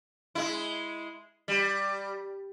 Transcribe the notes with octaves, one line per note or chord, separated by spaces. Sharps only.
G#3 E4
G3